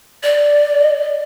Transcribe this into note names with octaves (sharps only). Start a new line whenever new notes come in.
D5